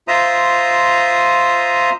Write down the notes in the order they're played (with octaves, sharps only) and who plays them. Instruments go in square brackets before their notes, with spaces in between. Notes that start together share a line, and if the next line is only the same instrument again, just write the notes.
[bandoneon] F4 C5 E5 A#5 D#6